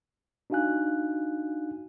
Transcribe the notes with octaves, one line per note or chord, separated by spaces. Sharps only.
D4 D#4 F#4 F5 G#5 F#6